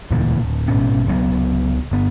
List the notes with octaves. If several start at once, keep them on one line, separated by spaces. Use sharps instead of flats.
E1 D2 A#2 E3
D1
A1 G#2 B2 C#4
C#2 G2 F#3 B3
G1 B3